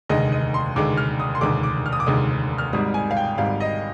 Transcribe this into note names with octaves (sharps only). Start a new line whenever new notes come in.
F1 D#2 D3 G#3 D#5
D#5
C6
F1 D#2 D3 G#3 D6
F6
D#6
C6
F1 D#2 D3 G#3 D6
D6
F6
D#6
D6
F1 D#2 D3 G#3 D#6
F6
G#1 G#2 G3 D#6
G#5
F5
G5
G#1 G#2 G3 F5
D#5